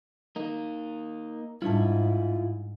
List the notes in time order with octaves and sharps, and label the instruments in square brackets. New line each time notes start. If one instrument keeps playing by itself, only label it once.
[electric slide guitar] A#3 D#4
[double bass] G#2 [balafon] G3 D4 A5 [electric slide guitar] E4 F4